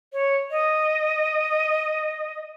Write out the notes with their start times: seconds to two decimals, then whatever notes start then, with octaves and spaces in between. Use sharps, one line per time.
0.13 C#5
0.51 D#5